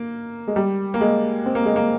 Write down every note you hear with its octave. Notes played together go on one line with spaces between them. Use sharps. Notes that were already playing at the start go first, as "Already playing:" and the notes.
Already playing: A#3
G#3
G3
A#3
G#3
C4
A#3
G#3
A#3